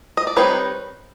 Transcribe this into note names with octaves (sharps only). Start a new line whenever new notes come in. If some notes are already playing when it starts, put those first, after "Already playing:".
D#5
D5
D#3 G3 C4 D#4 B4 C#5